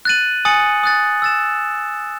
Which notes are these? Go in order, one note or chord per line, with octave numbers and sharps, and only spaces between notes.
F#6 A6 D#7 F#7
G#5 D#6 A6 C#7 F#7
D#6 F#6 A6
E6 A6 E7